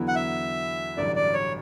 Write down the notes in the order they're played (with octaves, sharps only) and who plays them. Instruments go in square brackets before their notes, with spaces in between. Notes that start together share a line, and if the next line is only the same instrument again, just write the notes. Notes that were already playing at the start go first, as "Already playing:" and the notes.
Already playing: [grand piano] E2 D3 F#3 B3 E4
[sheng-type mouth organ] F#5
E5
[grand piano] A1 G2 D3 F#3 [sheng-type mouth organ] D5
[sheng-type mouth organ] D5
C#5